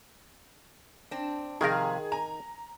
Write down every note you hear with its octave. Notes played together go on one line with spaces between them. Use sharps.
C4 D4
C3 D#3 F3 G#4 A#4 F5
G#5 A#5